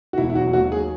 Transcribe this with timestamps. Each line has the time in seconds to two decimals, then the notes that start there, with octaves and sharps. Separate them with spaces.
0.13 F#4
0.18 E1 E4
0.30 E4
0.35 F#3 F#4
0.53 D#2 F#4
0.72 F#3 G#4